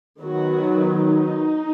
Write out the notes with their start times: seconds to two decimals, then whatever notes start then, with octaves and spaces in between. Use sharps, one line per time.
0.22 D#3 F#3 B3 F#4
0.89 D#4